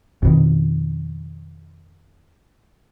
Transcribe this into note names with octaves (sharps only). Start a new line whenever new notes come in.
F2 B2 D#3